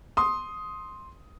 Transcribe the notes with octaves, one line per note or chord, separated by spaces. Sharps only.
C6 D#6